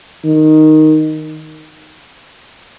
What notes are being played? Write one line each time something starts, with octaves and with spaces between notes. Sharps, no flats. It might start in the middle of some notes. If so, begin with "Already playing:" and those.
D#3